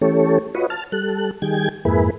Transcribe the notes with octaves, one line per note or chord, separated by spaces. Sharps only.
E3 A3 C#4 G4 A4 C#5
F4 F#4 B4 C#5 D#5
A5 F6
G3 A4 F#6
D#3 G3 G#4 G5 G#6
F2 G#2 A#3 E4 G#4 B4